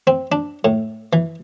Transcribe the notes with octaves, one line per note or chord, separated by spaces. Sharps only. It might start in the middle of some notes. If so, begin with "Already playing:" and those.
C4
D4
A2
E3